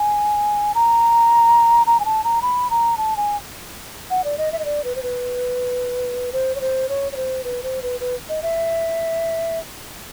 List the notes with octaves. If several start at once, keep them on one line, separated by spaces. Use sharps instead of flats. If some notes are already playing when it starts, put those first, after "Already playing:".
Already playing: G#5
A#5
A#5
G#5
A5
A#5
B5
A#5
A5
G#5
F#5
D5
D#5
E5
D#5
D5
B4
C5
B4
C5
C#5
C5
C#5
C#5
C5
B4
C5
B4
B4
D#5
E5